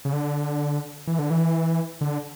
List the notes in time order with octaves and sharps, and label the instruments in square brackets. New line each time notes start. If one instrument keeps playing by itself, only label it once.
[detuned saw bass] C#3
D3
E3
D3
E3
D3